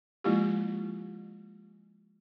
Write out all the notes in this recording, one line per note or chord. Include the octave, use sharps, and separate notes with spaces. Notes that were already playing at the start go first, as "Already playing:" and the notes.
F3 G#3 A#3 E4 F4 G4